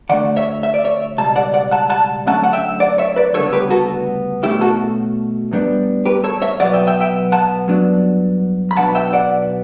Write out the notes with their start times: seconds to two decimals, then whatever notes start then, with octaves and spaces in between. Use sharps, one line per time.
0.09 D2 D3 A3 D4 D5 F#5
0.36 C#5 E5
0.63 E5
0.74 D5
0.84 C#5 E5
1.18 C#2 B2 G3 A5
1.36 D5 F#5
1.54 D5 F#5
1.71 F#5 A5
1.90 F#5 A5
2.26 F#2 D3 A3 C#4 F#5 A5
2.44 F#5
2.53 E5 G5
2.80 D5 F#5
2.98 C#5 E5
3.16 B4 D5
3.34 D2 C#3 G3 B3 D4 A4 C#5
3.53 G4 B4
3.70 F#4 A4
4.43 B2 A3 C#4 E4 G4
4.61 F#4 A4
5.51 A2 G3 B3 D4
6.06 G4 B4
6.24 A4 C#5
6.42 C#5 E5
6.60 B2 F#3 B3 D5 F#5
6.73 E5 G5
6.87 E5 G5
7.00 E5 G5
7.32 F#5 A5
7.68 G2 F#3 B3 D4
8.71 B5
8.77 B1 B2 F#3 B3 D4 F#5 A5
8.95 E5 G5
9.13 D5 F#5